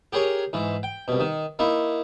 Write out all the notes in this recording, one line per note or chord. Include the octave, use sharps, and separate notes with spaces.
G4 G#4 A#4 C#5 G#5
G#2 E3
G5
C2 B2
D#3
A#3 D#4 E4